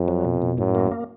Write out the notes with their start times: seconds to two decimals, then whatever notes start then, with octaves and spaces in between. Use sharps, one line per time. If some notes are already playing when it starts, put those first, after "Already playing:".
Already playing: F2
0.08 F#3
0.25 B2
0.42 B2
0.58 F#2 A2
0.75 A#3
0.92 A#3